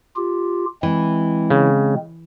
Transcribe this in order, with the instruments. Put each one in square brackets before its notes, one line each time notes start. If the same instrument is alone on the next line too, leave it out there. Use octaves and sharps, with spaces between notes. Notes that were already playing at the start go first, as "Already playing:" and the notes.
[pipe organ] F4 G4
[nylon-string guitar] E3 [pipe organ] G#3 C4
[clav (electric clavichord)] C#3